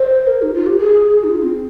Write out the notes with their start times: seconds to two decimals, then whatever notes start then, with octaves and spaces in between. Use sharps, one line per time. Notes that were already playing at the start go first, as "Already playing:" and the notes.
Already playing: C5
0.27 A#4
0.42 D#4
0.54 F4
0.66 G4
0.78 G#4
1.24 D#4
1.30 F4
1.43 C4